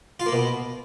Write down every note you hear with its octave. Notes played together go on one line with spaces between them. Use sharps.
F4
A#3
B2